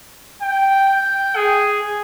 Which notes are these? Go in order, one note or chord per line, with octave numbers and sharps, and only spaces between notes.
G5
G5
G#4